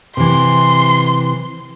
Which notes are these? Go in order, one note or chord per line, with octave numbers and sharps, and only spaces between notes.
C3 E3 C6